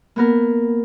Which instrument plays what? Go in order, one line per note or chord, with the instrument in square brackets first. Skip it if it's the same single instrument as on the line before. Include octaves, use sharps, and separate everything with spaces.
[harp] A#3 B3 A#4